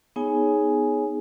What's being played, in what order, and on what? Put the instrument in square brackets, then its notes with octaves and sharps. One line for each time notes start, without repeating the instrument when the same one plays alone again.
[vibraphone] B3 D#4 G#4 C#5 G#5